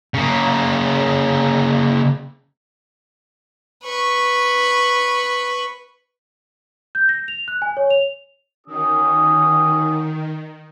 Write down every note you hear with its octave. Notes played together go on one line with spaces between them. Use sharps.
C#3 A#3
B4 C#6
G6
A#6
F7
F#6
G#5
C#5
F7
D#3 C#4 F#4 D#6